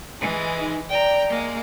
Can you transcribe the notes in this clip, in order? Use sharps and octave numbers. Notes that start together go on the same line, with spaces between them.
E3 G#3 G#4
D#4
D5 G5 A#5
G#3 A#3